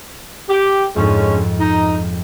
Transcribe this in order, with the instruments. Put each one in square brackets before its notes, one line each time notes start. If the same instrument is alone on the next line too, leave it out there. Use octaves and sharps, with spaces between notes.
[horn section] G4
[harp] F2 G#2 [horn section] D3 G#3 C#4
[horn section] D#4